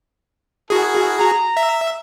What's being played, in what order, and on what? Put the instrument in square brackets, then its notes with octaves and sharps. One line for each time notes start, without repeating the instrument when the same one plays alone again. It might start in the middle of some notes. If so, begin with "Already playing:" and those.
[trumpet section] E4 A#4 A5 [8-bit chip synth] F#4 G#4
[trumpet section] A#5
[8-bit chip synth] E5